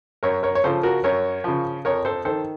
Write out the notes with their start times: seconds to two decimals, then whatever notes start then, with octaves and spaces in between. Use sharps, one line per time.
0.23 F#2 A#4 C#5
0.43 A#4 C#5
0.55 C#5
0.64 C#3 F3 A4 C5
0.83 F#4 A#4
1.04 F#2 A#4 C#5
1.44 C#3 F3
1.85 F2 A#4 C#5
2.05 A4 C5
2.25 D#3 A4 C5